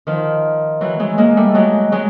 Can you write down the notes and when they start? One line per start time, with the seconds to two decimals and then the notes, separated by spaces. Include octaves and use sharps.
0.07 D#3 F3
0.81 E3 F#3
0.99 F#3 G#3
1.18 G#3 A#3
1.37 G3 A3
1.54 F#3 G#3
1.92 F#3 G#3